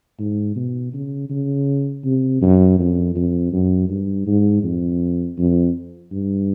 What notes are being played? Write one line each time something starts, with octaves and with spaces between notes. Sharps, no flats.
G#2
B2
C#3
C#3
C3
F#2
F2
F2
F#2
G2
G#2
F2
F2
G2